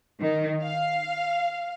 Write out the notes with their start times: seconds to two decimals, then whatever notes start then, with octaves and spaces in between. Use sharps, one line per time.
0.20 D#3
0.62 F5